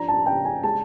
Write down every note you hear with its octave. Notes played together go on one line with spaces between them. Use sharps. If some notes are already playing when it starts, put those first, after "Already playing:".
Already playing: F3 D4 A#5
A5
C#3 G5
G#5
G#3 A5